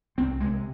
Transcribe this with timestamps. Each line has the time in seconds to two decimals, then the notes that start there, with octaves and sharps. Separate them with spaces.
0.18 C2 C4
0.40 C3 G#3